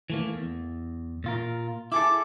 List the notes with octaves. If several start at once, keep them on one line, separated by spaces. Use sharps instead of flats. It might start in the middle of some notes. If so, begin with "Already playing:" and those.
E3 A3 A#3
E2
A#2 F4 A#4
E4 G#4 A4 D6